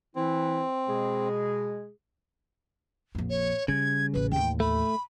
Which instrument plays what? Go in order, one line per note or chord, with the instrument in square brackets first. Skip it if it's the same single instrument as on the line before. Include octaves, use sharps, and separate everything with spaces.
[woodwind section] E3 E4 [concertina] C4
[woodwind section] B2 G#3 G#4
[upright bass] A#1 F2
[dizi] C#5
[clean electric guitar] C#3 [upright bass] G3 [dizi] G#6
[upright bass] E1 A1 [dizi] B4
[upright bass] A1 D#2 [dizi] G5
[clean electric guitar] A3 [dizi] B5